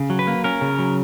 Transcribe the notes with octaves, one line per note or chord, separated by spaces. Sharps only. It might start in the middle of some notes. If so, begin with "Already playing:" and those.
Already playing: C#3
F#3
B4
A#3
C#4 A#4
C#3
F#3